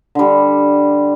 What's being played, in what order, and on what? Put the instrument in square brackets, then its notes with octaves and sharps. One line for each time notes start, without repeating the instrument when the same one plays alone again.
[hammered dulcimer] D3 G3